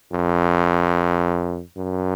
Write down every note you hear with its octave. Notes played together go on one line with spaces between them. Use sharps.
F2
F#2